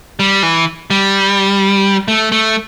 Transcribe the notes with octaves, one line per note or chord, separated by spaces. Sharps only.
G3
E3
G3
A3
A3